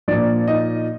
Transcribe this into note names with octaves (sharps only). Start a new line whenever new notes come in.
A#2 F3 D4 D5
D#4 D#5